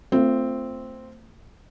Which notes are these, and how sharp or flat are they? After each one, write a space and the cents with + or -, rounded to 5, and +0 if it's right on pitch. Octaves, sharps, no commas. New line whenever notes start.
A3 +30 C4 -5 F4 +0